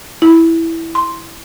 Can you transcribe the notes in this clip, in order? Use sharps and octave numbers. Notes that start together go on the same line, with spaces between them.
E4
C6